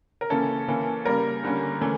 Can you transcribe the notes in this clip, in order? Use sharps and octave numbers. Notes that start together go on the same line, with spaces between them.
A#4
C#3 E3 A#3 C#4 A4
E3 A#3 C#4
C#3 G3 A#3 A#4
D3 G3 A#3 C#4
E3 A3 C#4